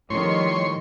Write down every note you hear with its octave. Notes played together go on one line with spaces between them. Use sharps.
A2 D#3 F3 G3 C#5 C6